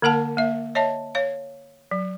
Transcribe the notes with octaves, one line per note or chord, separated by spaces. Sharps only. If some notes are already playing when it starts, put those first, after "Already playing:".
D3 A#3 A#4 F#5 A5
A#3 E5
C#5 D#5 E5 A5
C#5 F5
F#3